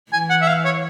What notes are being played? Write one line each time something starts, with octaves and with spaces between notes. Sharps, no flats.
E3 G#5
F#5
E5
F5
C#5